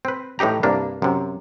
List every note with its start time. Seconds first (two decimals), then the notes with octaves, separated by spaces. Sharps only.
0.05 C4 B4
0.39 A2 E3 D#4 G4 A#5
0.63 C2 G2 A#3 D4
1.02 F#2 C3